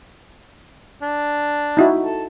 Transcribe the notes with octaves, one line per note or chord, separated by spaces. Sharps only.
D4
D#4 E4 F#4
A4